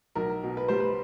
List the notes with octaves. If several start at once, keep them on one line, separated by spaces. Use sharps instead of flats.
B1 A#4
B2
B4
G3 C5
B4